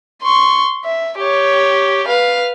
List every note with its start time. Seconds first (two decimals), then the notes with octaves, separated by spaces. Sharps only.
0.23 C6 C#6
0.85 E5
1.18 G4 C#5
2.08 B4 F5